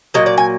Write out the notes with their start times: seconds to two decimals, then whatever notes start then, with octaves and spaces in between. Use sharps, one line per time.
0.14 A#2 F#3 A#3 D#5
0.26 D5
0.38 G#5